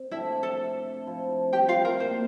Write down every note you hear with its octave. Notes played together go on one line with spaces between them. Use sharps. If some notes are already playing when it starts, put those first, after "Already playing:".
Already playing: C4
C3 F3 A3 D4 E4 E5
A4 A5
F3 C4 E4
G4 G5
F4 F5
A#4
A#2 G3 A#3 C5